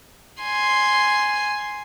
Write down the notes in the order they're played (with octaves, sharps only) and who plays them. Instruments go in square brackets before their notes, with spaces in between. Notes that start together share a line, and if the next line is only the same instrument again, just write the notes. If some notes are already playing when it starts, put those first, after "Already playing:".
[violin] G#5 C6